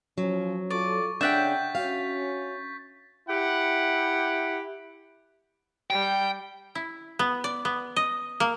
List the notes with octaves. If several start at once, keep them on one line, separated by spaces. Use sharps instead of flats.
F3 F#3 C#4
F4 A4 D5 C#6
C#3 D4 E5 F#5 G5 G6 A6 B6
C#4 F#4 F5
E4 G4 F#5
G3 G5
E4
B3
D5
B3
D#5
A#3